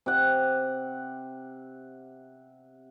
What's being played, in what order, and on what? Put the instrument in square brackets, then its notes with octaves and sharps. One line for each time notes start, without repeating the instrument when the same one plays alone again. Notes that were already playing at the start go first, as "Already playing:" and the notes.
[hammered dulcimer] C3 F#5